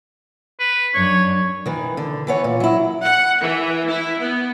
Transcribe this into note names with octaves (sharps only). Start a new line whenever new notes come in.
B4
F#2 F#3 D4 C#5
D#3 E3
D3
E3 B3 C#5
A#2
F#3 E4
F#5
E3
E4
B3